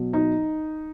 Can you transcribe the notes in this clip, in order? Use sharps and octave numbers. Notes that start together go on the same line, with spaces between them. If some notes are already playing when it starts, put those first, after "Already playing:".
Already playing: B2 F#3
D#4